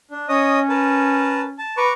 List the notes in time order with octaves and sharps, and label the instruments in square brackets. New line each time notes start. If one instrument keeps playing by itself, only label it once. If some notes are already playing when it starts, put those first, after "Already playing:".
[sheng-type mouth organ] D4
[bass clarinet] C#4 [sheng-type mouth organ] C#5 D#5 D#6
[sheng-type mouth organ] A#4 B4 A5
A5
[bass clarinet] B4 [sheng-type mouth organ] A#5 C#6 D6